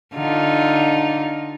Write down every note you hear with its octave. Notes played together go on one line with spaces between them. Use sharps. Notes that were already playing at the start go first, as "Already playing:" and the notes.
D3 D#4 F4